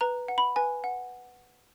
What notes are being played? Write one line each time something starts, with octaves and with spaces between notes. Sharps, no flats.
B4 A#5
F#5
B5
B4 G#5
F#5